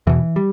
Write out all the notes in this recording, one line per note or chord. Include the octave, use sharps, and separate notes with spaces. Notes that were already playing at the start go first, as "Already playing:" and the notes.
E2 B2 E3
G3